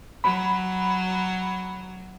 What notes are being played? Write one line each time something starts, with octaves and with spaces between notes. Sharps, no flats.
F#3 B5